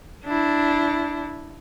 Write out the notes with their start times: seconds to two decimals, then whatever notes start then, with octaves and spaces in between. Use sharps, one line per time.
0.25 D4 E4